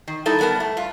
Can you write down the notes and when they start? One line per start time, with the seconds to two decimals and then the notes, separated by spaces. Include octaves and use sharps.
0.08 D#3
0.26 G3 D#4 E4 A4
0.39 D3 G3 B3 A#4 A5
0.60 A3
0.77 G2 F4